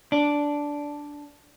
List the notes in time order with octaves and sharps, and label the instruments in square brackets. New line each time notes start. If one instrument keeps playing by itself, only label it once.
[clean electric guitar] D4